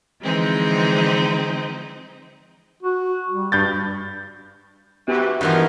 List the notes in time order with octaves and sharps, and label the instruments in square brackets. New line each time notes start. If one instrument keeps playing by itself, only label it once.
[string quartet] D3 E3 F3 G#3 C4 D#4
[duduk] F#4
G3
[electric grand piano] G2 G6 A6
[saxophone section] G#2 C3 E3 [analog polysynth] B3 F#4 G4
[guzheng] G2 E3 B3 [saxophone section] F3 D#4 [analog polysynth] A#4 E5